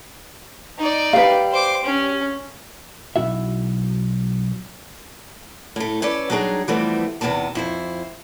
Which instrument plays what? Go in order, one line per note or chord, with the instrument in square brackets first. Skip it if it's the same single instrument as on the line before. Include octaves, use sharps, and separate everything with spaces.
[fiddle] D#4 D5
[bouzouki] G3 G4 [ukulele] B4 F5
[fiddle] C5 D6
C#4
[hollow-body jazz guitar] B1 B2 E4 F#4 E5
[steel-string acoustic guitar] A2 A3
C#4 A4 B4 D5
F#3 G3 D4 D#4 G#4
E3 F3 G3 A3 B3 C4
E2 C3 D#3 B3 A5
F2 E4 C5